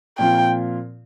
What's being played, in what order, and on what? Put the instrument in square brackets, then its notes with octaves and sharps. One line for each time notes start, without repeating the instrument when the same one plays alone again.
[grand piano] A#2 F3 C4 F4 [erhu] G5